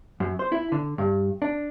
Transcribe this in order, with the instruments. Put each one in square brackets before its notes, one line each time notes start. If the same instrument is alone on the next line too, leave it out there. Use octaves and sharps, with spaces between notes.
[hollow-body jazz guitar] F#2
C5
E4
D3
G2
D4